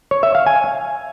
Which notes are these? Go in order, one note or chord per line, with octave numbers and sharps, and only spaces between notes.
C#5
E5
F5
G#5